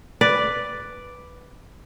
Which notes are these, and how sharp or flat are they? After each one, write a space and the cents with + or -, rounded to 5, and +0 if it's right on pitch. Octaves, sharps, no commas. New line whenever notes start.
B4 +0 D5 +0